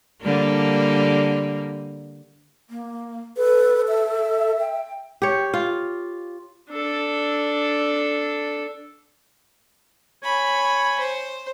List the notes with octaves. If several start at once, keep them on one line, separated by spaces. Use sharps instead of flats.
D3 G3 A#3
A#3
A4 B4
E5
G5
G4 C#5
F4
D4 A4
C#5 G#5 B5
C5